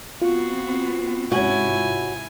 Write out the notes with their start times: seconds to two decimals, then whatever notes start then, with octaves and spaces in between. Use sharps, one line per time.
0.22 B3 C4 F4 F#4
1.32 G#2 C3 C#4 E4 F#4 G#5